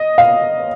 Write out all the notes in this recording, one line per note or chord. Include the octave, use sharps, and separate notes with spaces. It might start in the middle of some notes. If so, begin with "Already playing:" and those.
Already playing: D#5
F5